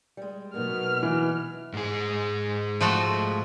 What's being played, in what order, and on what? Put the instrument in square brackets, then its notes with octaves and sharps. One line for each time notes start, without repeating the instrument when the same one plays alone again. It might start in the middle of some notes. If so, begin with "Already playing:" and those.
[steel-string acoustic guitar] G3 G#3
[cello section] B2 F#3 [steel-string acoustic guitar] A#3 B3 D#4 [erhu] F6
[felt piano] E3
[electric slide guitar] G#2 G#4
[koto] F3 A3 F#4